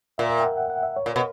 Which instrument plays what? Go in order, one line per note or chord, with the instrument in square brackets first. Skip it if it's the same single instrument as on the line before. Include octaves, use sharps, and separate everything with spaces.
[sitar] A#2 [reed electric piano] E5
[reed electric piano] E5
G5
F#5
F#5
F#5
E5
C#5
[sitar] A#2
B2